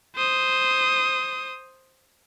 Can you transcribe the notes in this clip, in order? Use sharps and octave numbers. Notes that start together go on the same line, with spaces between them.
C5 D#6